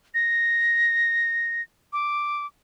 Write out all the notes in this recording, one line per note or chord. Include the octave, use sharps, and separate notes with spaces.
A#6
D6